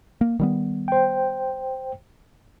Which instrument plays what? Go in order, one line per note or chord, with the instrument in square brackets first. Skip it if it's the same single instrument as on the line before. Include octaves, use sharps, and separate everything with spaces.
[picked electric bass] A#3
D#3 G3 B3
[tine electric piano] C5 G5